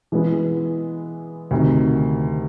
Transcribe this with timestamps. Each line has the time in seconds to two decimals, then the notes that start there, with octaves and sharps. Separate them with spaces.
0.12 E3 G#3 B3 E4
1.51 D2 C3 D#3